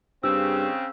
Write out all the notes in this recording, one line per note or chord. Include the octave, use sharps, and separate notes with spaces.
G2 C#3 C4 E6